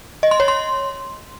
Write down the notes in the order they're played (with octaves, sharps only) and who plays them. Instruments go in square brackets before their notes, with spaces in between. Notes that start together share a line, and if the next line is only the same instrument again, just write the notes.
[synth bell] D#5
C6
C#5
C6